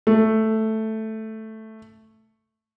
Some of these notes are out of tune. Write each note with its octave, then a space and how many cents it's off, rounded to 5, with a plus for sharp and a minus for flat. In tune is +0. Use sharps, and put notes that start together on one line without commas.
A3 +0